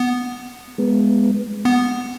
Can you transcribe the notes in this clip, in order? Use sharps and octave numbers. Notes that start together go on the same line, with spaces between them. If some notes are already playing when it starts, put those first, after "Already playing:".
Already playing: B3
G#3 B3
B3